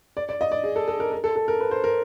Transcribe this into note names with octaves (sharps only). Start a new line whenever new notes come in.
D5
D5
D#5
D5
G#4
A4
A4
A#4
A#4
A4
A4
A#4
B4
C5
A#4